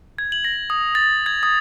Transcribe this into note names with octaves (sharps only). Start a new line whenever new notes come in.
G#6
F#7
A#6
D#6
A6
G#6
D#6